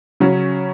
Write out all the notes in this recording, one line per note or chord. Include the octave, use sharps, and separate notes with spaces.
C#3 F#3 C#4